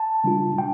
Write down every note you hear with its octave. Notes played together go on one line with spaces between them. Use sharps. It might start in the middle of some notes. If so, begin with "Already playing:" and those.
Already playing: A5
C#3 G3 D4 F4
G5